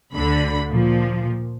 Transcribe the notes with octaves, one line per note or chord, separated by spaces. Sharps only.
D2 D3 B5
A#2 F3